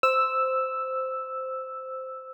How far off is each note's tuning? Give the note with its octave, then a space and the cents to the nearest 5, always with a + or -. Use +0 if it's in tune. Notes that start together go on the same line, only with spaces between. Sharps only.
C5 -5 E6 +0